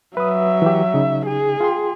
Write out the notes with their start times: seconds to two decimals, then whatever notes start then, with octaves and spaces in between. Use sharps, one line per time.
0.17 F#3 B4 E5 D#6
0.62 E3 G4
0.94 C#3 D#4
1.26 G#4
1.60 F4 G5 C6